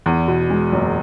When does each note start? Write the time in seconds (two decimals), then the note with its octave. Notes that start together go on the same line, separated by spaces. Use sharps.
0.06 E2
0.28 B2
0.50 G#3
0.72 F#1